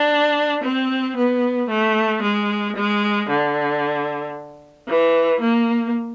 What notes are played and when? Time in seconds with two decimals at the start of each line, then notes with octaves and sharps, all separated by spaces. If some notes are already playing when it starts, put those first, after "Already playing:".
Already playing: D4
0.64 C4
1.16 B3
1.69 A3
2.22 G#3
2.76 G#3
3.29 D3
4.88 E3
5.40 A#3